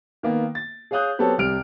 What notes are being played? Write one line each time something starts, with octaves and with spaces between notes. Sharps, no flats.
D#3 A#3 B3
A6
G#4 C#5 F5 D#6 F#6 G6
F#3 B3 C4 G4 A4 C#5
C2 C3 F6 D7